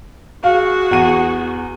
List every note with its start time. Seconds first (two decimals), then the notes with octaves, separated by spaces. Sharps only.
0.44 F#4 G#4 F5
0.91 E2 F#5 D#7